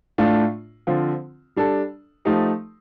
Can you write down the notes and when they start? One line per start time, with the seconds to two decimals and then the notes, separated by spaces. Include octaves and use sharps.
0.18 A2 A3 D4 F4
0.87 D3 F3 C4 F4
1.56 G3 D4 A4
2.25 F3 A3 D#4 G4